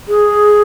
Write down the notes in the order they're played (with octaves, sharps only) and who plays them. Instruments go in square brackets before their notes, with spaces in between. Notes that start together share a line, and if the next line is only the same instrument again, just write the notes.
[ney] G#4